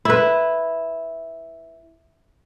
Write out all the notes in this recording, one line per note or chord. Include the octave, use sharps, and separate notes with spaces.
E4 B4